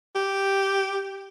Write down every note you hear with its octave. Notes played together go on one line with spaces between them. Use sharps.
G4